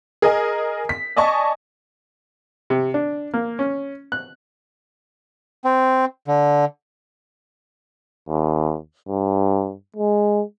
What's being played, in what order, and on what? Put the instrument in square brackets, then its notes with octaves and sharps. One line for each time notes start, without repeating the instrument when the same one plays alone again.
[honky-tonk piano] G#4 A#4 D#5 G#5
B6
D5 D#5 G#5 A5 C#6
[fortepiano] C3
D4
A#3
C#4
F#6
[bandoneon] C4
D3
[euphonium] D#2
G2
G#3